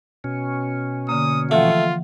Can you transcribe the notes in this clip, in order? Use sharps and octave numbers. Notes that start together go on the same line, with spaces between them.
B2 C#4
D3 A#3 D#6
E3 F3 A3 F4 F#5